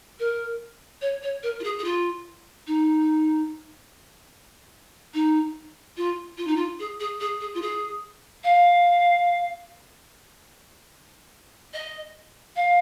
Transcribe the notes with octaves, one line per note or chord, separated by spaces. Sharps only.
A#4
C#5
C#5
A#4
F4
G#4
G#4
F4
D#4
D#4
F4
F4
D#4
F4
G#4
G#4
G#4
G#4
F4
G#4
F5
D#5
F5